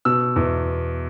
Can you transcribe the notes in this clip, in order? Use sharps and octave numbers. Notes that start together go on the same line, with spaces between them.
B2 E6
E2